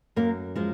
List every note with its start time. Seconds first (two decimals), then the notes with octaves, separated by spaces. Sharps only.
0.16 F#2 A#3
0.56 F3 G#3